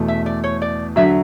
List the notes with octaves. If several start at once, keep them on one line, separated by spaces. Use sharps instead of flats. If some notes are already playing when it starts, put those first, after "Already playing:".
Already playing: E2 B2 A3
E5
D5
C#5
D5
D3 F#3 E5